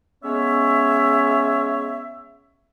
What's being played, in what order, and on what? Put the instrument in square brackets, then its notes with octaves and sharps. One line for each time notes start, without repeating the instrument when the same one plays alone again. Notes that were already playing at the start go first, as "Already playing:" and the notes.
[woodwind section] G#3 B3 C#4 C#5 E5